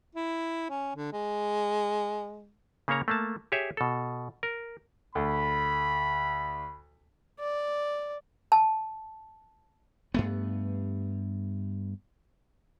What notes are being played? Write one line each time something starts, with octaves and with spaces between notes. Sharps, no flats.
E4
C#4
D3
G#3
C#3 A#3 C#4 C#5 A#5
A3 A#3 A5
G4 G#4 C#5 E5
B2 A4
A#4
D2 B5
D5
A5
G2 A3 B3